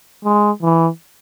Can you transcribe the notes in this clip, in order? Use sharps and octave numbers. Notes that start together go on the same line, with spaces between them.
G#3
E3